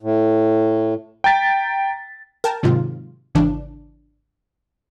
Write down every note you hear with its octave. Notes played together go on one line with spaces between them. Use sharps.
A2
G5 A#5 A6 B6
A#4 G5 A5
G#2 C3 D#3 F#3 F4
G#1 C#3 E3 D4